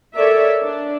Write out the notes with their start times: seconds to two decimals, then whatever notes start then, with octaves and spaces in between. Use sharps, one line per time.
0.15 A4 A#4 C#5 D5 E5
0.62 D4